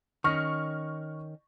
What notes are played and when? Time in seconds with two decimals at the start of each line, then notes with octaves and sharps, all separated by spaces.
0.24 D#3 C#4 C#6 F6 A#6